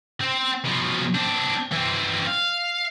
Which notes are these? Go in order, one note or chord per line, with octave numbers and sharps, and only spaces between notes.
C4
B2 F3
C4 D4
E3 C4
F5